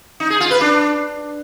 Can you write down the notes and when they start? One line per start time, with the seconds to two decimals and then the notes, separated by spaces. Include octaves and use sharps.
0.20 D#4
0.30 G#4
0.40 F4
0.51 B4
0.61 D4